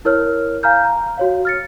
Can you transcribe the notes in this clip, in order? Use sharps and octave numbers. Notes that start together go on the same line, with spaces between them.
E4 A#4 C#5 F6
F5 G#5 A#5 F6 G6
A#5
F#4 C#5 F5
F6 A6 C#7